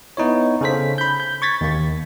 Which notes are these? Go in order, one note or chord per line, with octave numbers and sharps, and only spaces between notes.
B3 D#4 E4 C#5
C#3 C#4 A4 C5 B6
B5 G6
G6
C#6 G#6 A6 B6
D#2 A#3